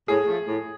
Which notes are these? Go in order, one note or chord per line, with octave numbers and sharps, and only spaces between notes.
A2 G#4
F3 A3
A2